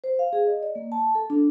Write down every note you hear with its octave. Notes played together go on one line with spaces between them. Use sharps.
C5
F5
G#4
D#5
D5
A#3
A5
A4
D4